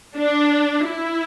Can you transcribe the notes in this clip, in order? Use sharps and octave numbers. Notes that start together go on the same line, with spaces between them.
D4
E4